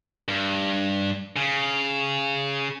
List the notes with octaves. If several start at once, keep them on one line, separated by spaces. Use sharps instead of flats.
G2
C#3